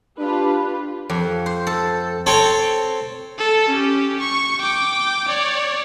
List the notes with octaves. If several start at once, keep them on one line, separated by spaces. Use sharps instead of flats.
D4 F4 G4 B4
F2
C5
A4
C4 A4 C#5
A4
C#4 G4
C#6
G5 D6
C#5 D5